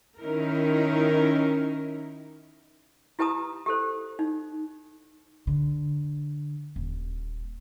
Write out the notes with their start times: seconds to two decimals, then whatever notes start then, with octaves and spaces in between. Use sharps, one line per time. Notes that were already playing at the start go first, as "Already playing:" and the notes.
0.19 D#3 C#4 D#4 E4 A#4
3.19 E4 G4 B4 A5 A#5 D#6
3.66 G4 A4 C5
4.19 D#4
5.47 D3
6.76 D#1